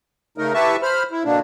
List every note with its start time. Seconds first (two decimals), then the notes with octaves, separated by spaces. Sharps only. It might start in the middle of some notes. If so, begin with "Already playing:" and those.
0.38 C#3 A3 D#4 A#4
0.54 E4 G4 B4 E5 A5 C#6
0.82 C5 B5 F6
1.11 E4
1.25 B2 D3 A#3 D4